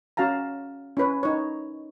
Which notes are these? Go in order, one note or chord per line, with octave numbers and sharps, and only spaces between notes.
C#4 F#4 F5 A5 A#5
C#4 E4 B4 C#5
D#4 C#5